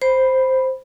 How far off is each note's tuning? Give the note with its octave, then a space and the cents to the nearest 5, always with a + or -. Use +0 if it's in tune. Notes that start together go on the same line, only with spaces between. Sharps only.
C5 +0 B5 +0